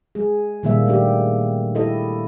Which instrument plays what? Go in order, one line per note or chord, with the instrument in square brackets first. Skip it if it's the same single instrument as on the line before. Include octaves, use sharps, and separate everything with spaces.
[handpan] G#3 G#4
A#2 D#3 G3 A#3 E5
D#3 A3 D4 G4
E4 G4 A4 D#5